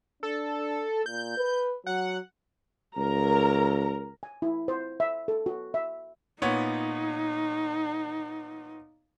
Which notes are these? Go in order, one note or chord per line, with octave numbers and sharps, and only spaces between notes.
D4 A4
A#2 G6
B4
F#3 F#5
C#2 A#4 A#5
G#5
E4
C5
E5
A4
F#4
E5
A#2 B3 D#4 C#5